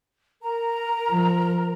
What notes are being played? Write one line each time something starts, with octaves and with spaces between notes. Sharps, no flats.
A#4 A#5
F3